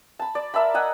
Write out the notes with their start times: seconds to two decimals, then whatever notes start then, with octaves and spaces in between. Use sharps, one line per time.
0.19 A5 B5
0.35 D5
0.54 A#4 E5 A5 B5
0.74 D#5 F#5 G#5